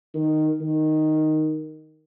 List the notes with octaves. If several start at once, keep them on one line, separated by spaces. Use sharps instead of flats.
D#3
D#3